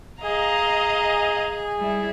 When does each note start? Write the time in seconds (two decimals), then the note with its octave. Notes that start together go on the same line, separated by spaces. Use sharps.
0.23 G#4 D#5 F5 A#5
1.78 G3 E4